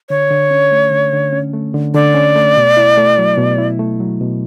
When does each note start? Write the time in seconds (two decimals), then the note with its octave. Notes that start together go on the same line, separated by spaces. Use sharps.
0.09 D3 C#5
0.31 D3
0.51 C#4
0.72 A3
0.91 D3
1.13 D3
1.32 C#4
1.54 A3
1.74 D3
1.94 D3 D5
2.14 C#4
2.36 A3
2.57 B2
2.77 E4
2.97 A3
3.18 F#3
3.38 B2
3.58 E4
3.79 A3
4.00 F#3
4.21 B2